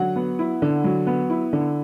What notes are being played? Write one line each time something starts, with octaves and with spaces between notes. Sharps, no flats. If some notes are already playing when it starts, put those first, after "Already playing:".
Already playing: D3 F#3 F#5
B3
E4
D3
F#3
B3
E4
D3